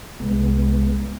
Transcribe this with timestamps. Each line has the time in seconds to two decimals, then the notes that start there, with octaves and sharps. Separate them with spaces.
0.20 C2 G#3 B3